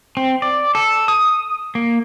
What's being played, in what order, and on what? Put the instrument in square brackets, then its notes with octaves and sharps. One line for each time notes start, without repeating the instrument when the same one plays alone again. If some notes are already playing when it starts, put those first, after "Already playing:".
[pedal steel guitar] C4
D5
A4
D#6
A#3